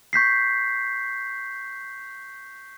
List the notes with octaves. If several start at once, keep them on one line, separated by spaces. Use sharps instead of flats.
C#6 G6 B6 C7